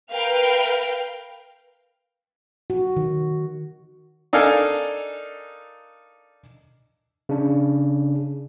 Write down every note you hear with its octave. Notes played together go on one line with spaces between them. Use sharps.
A#4 B4 F5 G5 F6
F#4
D#3
D4 D#4 A4 A#4 F5 G#5
C#3 D4